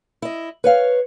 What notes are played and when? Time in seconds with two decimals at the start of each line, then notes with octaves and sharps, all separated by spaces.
0.22 E4 D#5
0.64 B4 C#5 F5